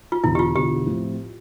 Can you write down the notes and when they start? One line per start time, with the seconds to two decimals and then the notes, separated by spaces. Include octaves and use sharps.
0.12 F4
0.24 E1 E2 D3 E4
0.35 G4
0.39 F4
0.55 E1 E2 D3 G4
0.86 A2 F3 C4